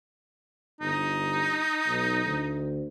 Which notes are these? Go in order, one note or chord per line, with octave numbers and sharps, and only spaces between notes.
G1 D#4
B1
D2